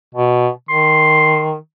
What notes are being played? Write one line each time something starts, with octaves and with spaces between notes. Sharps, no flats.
B2
D#3 C6